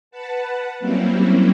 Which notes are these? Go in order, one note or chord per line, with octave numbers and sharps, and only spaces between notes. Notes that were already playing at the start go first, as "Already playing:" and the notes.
B4 F#5 A5
F#3 G3 A#3 C4 C#4 E4